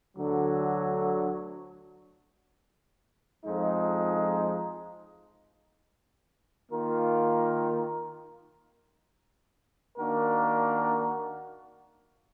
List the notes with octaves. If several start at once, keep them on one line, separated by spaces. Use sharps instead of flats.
D2 D3 F#3
F2 F3 G#3 D#4
D#3 A#3 F4 A#4
D#3 A#3 D4 F#4 A#4